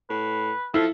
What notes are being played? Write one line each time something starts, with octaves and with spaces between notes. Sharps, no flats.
A2 B4
F3 E4 A4